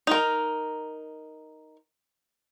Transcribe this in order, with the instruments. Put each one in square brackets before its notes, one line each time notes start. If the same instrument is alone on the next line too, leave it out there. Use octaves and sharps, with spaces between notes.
[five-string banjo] D#4 A#4